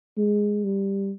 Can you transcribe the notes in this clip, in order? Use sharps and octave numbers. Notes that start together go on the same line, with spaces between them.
G#3
G3